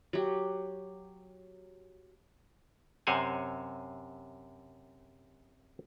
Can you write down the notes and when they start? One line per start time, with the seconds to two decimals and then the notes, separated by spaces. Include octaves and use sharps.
0.13 F#3 G4
3.07 F#2 C3 C5 C#5 F#5 G#5